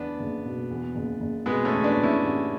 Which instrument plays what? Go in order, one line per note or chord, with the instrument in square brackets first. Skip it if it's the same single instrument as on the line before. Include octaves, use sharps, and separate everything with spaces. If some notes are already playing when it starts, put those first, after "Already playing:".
Already playing: [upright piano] E2 [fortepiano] B3 D4
[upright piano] F#1
B2
E2
F#1
F#1
[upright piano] B2 [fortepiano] G#3 B3
[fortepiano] A3 C#4
[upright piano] E2
[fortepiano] B3 D4
[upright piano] F#1
[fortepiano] C#4 E4
[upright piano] A1